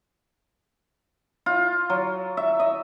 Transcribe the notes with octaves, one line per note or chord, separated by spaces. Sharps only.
F4
F#3
E5
D#5